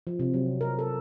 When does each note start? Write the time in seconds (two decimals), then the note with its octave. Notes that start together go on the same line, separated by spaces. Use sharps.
0.07 F3
0.19 C3
0.34 F#3
0.61 A#4
0.79 A4